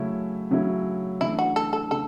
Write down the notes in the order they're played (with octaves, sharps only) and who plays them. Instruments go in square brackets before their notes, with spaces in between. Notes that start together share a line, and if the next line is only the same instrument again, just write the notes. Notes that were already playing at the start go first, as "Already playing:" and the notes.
Already playing: [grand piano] C#3 F#3 A3 C#4 E4
C#3 F#3 A3 C#4 E4
[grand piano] C#3 E3 A3 D4 [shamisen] E4
[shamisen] F#4
A4
A4
[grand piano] C#3 [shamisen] A4